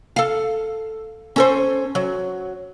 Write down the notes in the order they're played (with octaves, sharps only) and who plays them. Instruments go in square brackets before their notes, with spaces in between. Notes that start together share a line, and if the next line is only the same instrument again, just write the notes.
[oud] A4 F5
C#4 A4 C5
F#3